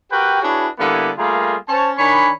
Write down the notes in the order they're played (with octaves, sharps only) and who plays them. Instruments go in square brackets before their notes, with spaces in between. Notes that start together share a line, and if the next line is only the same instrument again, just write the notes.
[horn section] F#4 G4 A#4 B4 G5
D4 E4 F#4 G#4 B4 C#5
D3 G3 A#3 B3 E4
G3 A3 A#3 F4 G#4 A#4
C#4 C5 C#5 A5
D#3 D4 C#5 G#5 B5